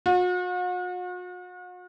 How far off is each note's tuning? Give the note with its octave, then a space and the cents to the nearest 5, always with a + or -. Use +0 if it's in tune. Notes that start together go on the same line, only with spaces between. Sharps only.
F#4 -45